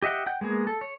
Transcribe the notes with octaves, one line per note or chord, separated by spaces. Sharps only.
G4 D#5 E5 F#5 G5
F#5 G5 G6
G#3 A#3 B3 G#4
A4
C#5